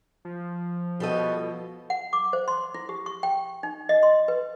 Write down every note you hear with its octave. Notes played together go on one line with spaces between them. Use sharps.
F3
B2 G3 A4 D#5
F#5
D6
C5
C6
E4
G4
C#6
G5
D#4
D#5
C6
B4